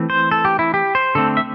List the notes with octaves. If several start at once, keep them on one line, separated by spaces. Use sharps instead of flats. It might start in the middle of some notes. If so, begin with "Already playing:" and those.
Already playing: E3 A3 C4
C5
A4
G4
E4
G4
C5
D3 A3 C4 A4
E5